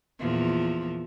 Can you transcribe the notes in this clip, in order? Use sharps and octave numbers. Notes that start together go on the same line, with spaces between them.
E2 A#2 F3